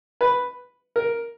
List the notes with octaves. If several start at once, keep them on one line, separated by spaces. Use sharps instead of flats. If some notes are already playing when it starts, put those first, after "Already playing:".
B4
A#4